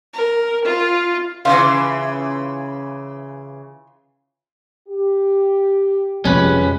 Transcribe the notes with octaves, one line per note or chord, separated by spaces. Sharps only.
A#4
F4
C#3 E3 F4 F5
G4
F1 G3 G#3 C#4 B4